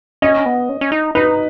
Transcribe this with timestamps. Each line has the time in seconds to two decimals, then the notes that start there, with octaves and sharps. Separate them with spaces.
0.22 C#4 D#5
0.46 B3
0.69 C#4
0.81 C#4
0.92 D#4
1.15 D#4 B4